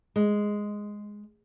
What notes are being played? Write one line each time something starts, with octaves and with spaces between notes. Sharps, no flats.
G#3